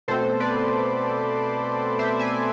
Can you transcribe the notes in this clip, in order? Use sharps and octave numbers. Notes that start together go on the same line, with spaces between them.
B2 A3 C4 A4 C5
B4 D5
C5 E5
E5 G#5